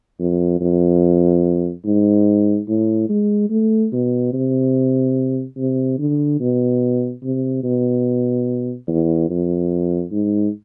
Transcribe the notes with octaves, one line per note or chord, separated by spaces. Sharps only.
F2
F2
G#2
A2
G#3
A3
B2
C3
C3
D3
B2
C3
B2
E2
F2
G#2